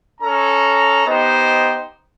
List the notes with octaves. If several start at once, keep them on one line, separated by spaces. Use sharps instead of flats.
C#4 A4 A#5
B3 D#4 G4 C5 D#5